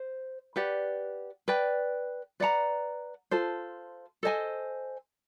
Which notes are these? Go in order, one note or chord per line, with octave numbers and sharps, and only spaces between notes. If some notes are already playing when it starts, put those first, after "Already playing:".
Already playing: C5
G4 B4 D5 F#5
B4 D5 G5
B4 D5 F#5 A#5
F4 A4 C5
A4 C5 D#5 G#5